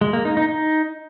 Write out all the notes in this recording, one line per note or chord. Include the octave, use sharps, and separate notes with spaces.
G#3
A#3
D#4
D#4
D#4